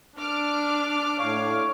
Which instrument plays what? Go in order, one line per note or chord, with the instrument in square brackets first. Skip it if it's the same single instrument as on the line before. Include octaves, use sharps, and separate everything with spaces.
[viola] D4 [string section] D6 F6
[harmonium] A2 F5 [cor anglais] C#5